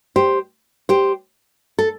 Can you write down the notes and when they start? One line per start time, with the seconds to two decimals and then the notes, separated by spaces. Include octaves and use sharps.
0.16 G4 C5
0.89 G4 C5
1.79 A4